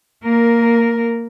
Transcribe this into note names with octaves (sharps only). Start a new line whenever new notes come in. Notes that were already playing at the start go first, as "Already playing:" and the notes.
A#3 A#4